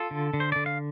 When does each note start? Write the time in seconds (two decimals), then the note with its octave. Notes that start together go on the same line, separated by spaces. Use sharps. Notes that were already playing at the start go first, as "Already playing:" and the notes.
Already playing: F4 A4
0.11 D3
0.34 D3
0.40 C5
0.52 D3 D5
0.66 F5